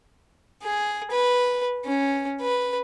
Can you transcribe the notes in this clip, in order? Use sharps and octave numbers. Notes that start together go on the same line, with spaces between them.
G#4
B4
C#4
B4